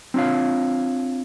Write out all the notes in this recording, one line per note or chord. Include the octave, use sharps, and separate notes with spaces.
C4 D4 F4 C#5 F5